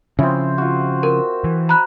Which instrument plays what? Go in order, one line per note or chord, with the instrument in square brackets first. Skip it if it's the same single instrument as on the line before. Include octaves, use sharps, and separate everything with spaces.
[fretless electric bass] C#3 F3 [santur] C4 E4
[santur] F4 F#4
[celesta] A#4 [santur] E6
[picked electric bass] E3
[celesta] A#5 B5 F#6